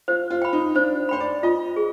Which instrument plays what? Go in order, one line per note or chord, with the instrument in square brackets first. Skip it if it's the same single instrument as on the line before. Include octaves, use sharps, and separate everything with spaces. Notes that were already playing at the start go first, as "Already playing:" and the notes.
[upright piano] F4 [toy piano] C5
[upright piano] F4
[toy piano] G5 B5
[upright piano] D#4
[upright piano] D4 [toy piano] C5
[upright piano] C5 [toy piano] G5 B5
[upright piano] D5
[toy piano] F4 [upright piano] D#5
[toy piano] G#4